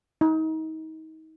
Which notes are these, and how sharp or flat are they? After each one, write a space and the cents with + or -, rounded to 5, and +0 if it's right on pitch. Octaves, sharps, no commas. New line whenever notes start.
D#4 +30